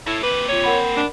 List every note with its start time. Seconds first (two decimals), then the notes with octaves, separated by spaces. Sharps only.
0.07 E4 A4 C#5
0.23 A#3 C4 B4
0.49 F4 C#5 D#7
0.64 A#4 F#5 B5
0.97 D4